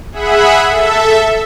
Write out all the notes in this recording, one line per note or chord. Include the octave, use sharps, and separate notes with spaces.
G#4 E5 F#5 B5
A4 E5